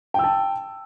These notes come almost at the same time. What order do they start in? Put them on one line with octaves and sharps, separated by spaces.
G5 E6 A5